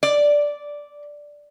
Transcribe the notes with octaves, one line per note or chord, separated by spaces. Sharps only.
D5